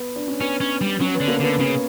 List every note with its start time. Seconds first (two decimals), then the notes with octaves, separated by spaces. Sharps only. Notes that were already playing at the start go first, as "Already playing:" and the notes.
Already playing: B3
0.16 D4
0.28 C#4
0.41 B3 C#4
0.61 C#4
0.81 G3
1.01 F#3 C#4
1.14 B3
1.21 D3
1.28 A#3
1.40 D3 B3
1.60 C#3 C#4